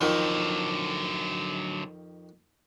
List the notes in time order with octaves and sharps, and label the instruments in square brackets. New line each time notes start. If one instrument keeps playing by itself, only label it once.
[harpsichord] F2 D#3 [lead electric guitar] D3 F#3